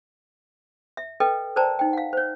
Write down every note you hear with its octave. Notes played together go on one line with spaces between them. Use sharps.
E5
A4 B4 D#5 G5
A#4 C5 D5 G5 A5 A#5
D#4 G5
F5 F#5
C5 C#5